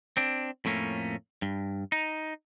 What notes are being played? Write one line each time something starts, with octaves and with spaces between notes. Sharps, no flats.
C4 D4
F2 A2 A3 A#3 C#4
G2
D#4